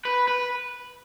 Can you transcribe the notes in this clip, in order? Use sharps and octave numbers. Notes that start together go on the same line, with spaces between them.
B4
B4